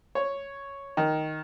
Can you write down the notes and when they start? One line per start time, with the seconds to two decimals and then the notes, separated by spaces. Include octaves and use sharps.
0.15 C#5
0.97 D#3